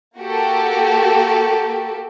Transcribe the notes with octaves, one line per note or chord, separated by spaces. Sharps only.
A#3 F#4 G4 A4